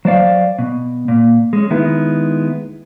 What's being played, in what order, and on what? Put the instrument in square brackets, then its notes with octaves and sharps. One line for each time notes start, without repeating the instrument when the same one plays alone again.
[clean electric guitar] F#3 C5 D5 F5
B2
A#2
G#3 C#4
D#3 G#3 B3 E4